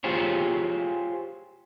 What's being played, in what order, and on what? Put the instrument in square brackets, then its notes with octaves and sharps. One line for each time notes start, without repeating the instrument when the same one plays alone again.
[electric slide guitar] F4 G4 G#4 C5 C#5